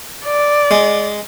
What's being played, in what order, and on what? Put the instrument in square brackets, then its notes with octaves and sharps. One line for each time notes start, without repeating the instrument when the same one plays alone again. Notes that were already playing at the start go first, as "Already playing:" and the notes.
[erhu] D5
[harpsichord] G#3